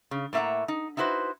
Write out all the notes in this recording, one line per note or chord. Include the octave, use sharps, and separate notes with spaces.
C#3
A2 A#3 E5 F#5 A#5
D#4
D#4 E4 F#4 B4 C5